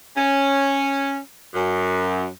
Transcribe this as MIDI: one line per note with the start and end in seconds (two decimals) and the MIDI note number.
0.16 1.17 61
1.54 2.26 42